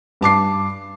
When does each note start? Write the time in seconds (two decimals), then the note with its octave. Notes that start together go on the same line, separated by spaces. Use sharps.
0.21 G2 A5 D6 C7